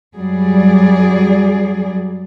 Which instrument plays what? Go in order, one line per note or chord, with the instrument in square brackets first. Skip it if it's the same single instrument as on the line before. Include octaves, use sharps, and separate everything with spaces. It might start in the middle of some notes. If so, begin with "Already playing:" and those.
[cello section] F#2 F#3 G3 G#4 D5